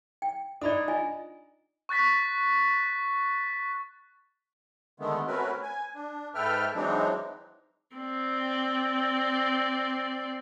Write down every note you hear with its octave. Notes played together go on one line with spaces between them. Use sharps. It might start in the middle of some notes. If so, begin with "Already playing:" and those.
G5
D4 D#4 D5 B5 D#6
F4 D#5 G#5
C#6 F#6 A6 B6
D3 D#3 G#3 A3 B3
A3 C4 C#4 F#4 A#4 B4
G#5
D4
G#2 A4 B4 E5 G5 F6
E3 F#3 G#3 C4 D4 D#4
C4 D5